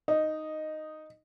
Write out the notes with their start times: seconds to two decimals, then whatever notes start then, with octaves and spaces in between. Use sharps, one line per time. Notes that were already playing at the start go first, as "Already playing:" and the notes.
0.08 D#4 D#5